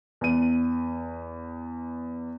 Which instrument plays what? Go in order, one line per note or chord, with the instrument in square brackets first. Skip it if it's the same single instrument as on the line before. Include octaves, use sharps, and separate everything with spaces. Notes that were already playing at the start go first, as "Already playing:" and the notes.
[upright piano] E2 D#7